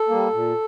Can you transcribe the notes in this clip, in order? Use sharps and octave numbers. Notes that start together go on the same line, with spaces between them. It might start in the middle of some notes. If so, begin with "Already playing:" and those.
Already playing: A4
G3 A#3
A#2